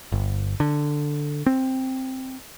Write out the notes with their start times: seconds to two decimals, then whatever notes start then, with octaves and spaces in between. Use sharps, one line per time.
0.12 G1
0.60 D3
1.46 C4